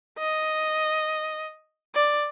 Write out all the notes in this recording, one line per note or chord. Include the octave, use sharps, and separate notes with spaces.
D#5
D5